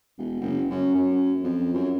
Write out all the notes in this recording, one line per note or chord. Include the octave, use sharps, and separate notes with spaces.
E1
F#1
F#2
F#2
F2
F#2